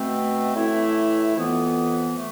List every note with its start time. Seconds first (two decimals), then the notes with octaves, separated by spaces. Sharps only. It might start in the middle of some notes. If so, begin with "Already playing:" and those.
Already playing: B2 A3 C4
0.55 A2 E3 A3 E4
1.35 F2 E3 B3
2.16 A3